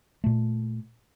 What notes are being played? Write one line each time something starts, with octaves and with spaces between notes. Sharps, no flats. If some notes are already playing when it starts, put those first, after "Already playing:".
A#2 A3